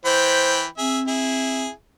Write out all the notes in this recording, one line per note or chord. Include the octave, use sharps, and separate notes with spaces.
E3 C5 G5 B5
C4 G#4 E5
E4 G#4